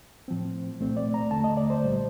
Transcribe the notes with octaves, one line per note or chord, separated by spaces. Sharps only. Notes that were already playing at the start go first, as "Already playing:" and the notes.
A2 F3 C4
C2 A#2 A3 C4
D5
A#5
D#2 D3 A3 A5
D#5
D5
C5
C2 A#2 G3